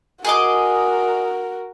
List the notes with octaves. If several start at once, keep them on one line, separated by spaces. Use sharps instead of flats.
F#4 G#4 A#4 D#5 D6